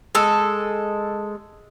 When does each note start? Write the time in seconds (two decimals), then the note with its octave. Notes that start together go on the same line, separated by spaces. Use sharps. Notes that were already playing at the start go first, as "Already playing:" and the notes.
0.15 G#3 A4